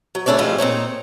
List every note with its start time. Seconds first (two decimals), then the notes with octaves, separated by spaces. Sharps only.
0.15 F#3
0.26 C#3 A3 D4 C#5 D5
0.38 A2 F3 G3 G#3 F4
0.58 A#2 C4 D#4 C#5